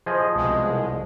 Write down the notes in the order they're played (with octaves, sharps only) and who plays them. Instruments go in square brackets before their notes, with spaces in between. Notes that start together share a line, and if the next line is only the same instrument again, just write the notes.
[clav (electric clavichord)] F3 G#4 D#5
[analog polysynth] C2 B2 G#3